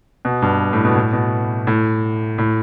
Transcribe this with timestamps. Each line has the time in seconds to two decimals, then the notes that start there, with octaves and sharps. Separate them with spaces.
0.25 B2
0.42 G2
0.73 A2
0.85 B2
0.96 A2
1.13 B2
1.67 A2
2.38 A2